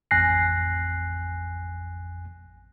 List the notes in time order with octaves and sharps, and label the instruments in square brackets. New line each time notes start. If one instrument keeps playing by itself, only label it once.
[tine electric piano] A1 F2 G#5 F#6 A#6 C7